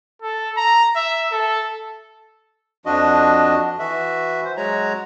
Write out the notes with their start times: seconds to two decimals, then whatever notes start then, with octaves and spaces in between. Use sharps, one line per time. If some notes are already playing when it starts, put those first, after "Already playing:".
0.22 A4
0.57 A#5
0.96 E5
1.32 A4
2.86 F2 F3 D4 F#4 D#5
3.79 E3 F#4 E5
4.44 C5
4.57 F#3 G#3 F#4 C#5 A#5